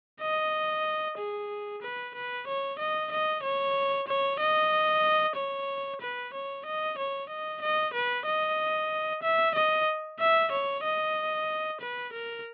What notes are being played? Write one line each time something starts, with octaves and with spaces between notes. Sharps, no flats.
D#5
G#4
B4
B4
C#5
D#5
D#5
C#5
C#5
D#5
C#5
B4
C#5
D#5
C#5
D#5
D#5
B4
D#5
E5
D#5
E5
C#5
D#5
B4
A#4